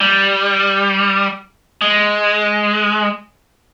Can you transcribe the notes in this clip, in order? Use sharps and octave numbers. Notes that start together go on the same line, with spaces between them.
G3
G#3